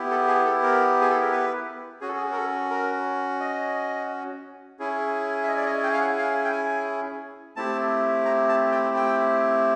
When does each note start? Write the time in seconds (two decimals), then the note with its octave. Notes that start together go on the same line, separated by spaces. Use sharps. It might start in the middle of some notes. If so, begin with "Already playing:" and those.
Already playing: B3 E4 G4
0.11 A4
0.28 G#4
0.45 A4
0.63 A#4
1.01 G#4
1.11 A4
1.21 A#4
1.32 B4
2.01 C#4 F#4 G#4
2.09 A4
2.17 G#4
2.32 A#4
2.36 A4
2.70 A#4
3.40 D#5
4.79 C#4 E4 G#4
5.44 E5
5.48 D#5
5.57 D5
5.66 D#5
5.84 G5
5.93 F5
6.01 F#5
6.18 F5
6.44 G5
6.52 G#5
7.56 A3 C4 E4 G4 A5
8.25 A#5
8.49 A5
8.72 G5
8.96 G5